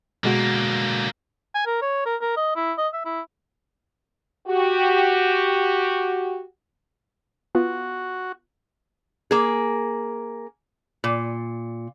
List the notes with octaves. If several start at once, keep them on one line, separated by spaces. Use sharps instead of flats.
B2 D3 G#3 A#3 F#4
G#5
A#4
C#5
A#4
A#4
D#5
E4
D#5
E5
E4
F#4 G4
B3 F4 F#4
A#3 G#4
A#2